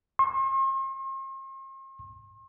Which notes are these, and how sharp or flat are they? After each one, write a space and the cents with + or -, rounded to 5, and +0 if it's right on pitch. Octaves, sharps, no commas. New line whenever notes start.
C6 +45